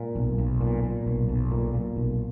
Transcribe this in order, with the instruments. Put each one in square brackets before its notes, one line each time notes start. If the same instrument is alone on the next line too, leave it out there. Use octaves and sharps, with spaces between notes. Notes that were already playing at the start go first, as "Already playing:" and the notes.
Already playing: [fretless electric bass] A#2 G#3
B1
B1
A#2
A#2
B1
B1
A#2
A#2
B1